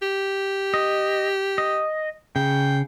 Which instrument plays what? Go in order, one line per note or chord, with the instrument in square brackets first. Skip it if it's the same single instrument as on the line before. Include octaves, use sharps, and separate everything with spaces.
[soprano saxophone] G4
[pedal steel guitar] D#5
D#5
[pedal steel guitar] C#3 [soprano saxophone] G5